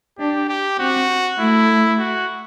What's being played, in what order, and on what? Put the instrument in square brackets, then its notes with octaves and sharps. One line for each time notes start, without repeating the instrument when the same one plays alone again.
[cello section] D4 [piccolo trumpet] G4
[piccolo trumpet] G4
[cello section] C4 [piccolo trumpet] F#4
[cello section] A3 [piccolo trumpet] E4
[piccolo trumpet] F#4